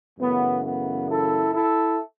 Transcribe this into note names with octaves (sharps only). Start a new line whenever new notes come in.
F#2 C#3 E3 A3 B3
B3
E4 A4
E4 A4